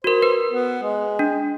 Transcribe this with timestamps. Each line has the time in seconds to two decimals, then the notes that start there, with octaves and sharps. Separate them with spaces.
0.04 F#4 A#4 C5
0.22 B4
0.50 B3
0.82 G#3
1.19 D4